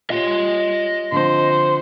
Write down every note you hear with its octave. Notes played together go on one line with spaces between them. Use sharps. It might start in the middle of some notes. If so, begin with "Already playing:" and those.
F4 G4 C#5 D#5 C6
D3 F3 C4 C5